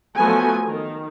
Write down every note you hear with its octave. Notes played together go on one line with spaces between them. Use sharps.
F3 F#3 A3 B3 A4 G#5
D#3